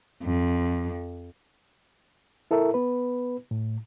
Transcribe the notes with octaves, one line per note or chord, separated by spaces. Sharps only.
F2
E4 A4 A#4 E5
B3 B4
A2